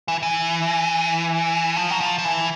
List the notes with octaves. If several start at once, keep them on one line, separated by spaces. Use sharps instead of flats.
E3
E3
F3
F#3
F3
F3
E3